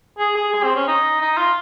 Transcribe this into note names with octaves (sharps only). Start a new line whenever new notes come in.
G#4
G#4
G#4
C4
C#4
D#4
D#4
F4